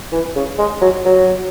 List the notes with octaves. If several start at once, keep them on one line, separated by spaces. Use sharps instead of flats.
E3
C#3
G#3
F#3
F#3